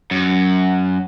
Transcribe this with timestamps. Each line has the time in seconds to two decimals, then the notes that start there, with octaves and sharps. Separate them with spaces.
0.11 F#2